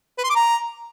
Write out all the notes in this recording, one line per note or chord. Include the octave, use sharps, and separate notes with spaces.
B4
C6
D6
A#5